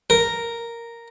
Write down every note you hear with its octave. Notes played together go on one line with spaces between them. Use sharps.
A#4